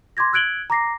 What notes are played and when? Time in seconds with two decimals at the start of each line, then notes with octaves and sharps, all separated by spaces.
0.17 C6 D6 G#6 A#6
0.33 E6 F#6 G#6 D7 F#7 G7
0.70 A#5 D6 A#6 C7